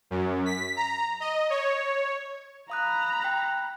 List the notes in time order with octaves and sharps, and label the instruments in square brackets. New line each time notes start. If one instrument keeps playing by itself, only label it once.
[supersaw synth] F#2
B6
A#5
D#5
C#5
[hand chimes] F5 D#6 F#6 [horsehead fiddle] A#5 B5
[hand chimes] G5 F#6